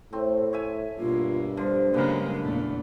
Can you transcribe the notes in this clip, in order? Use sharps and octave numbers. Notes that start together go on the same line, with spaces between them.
A2 A3 C4
C#5 E5 G#5
G2 B2 A#3 F4
D3 F3 G3
C#3 F#3 G#3 A#3 B3 D4 A#4
E2 A#2 A3